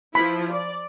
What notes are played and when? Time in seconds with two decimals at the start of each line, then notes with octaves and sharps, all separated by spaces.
0.15 F3 E4 B5
0.52 D5